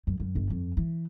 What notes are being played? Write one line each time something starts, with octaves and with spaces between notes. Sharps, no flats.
F#2
F#2
G1
F2
E3